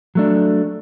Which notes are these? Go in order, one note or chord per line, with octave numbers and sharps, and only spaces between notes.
F#3 A3 D4